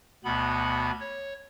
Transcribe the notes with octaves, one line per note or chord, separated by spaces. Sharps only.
D2 B2 B3 B5
C#5